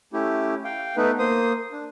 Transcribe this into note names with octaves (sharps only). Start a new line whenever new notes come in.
A3 C#4 E4 G4
F5 G5
A3 B3 D#4 B4
A#3 C5 D#6
D4